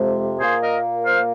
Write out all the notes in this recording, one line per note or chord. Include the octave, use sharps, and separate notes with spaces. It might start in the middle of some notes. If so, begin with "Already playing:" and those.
Already playing: F2 C3 F3 G#3
A#2 A#3 G#4 C5
A#4 D#5
C5 F5